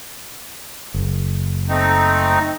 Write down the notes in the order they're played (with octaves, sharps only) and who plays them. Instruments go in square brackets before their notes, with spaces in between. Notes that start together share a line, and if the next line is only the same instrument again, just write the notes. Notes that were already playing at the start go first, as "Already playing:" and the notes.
[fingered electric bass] F#1
[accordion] A3 C4 D#4